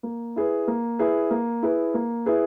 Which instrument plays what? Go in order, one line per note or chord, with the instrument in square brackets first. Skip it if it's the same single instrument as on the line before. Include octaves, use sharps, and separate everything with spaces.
[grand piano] A#3
E4 G#4 B4
A#3
E4 G#4 B4
A#3
E4 G#4 B4
A#3
E4 G#4 B4